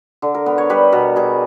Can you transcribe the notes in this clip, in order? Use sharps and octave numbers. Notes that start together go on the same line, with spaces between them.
D3
A#4
B3 A#4
C#5
G3 B4
B2 A#4
G3 G#4